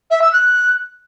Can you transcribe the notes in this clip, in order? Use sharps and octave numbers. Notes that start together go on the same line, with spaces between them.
E5
E6
F#6